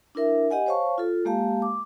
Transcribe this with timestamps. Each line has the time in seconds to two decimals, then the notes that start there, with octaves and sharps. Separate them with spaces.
0.15 D4 E4 A#4 E5
0.51 G4 D#5 F#5 G#5
0.66 C5 C#5 F5 A5 C#6
0.98 F4 A4
1.25 G#3 A#3 G4 F5 A5
1.62 D6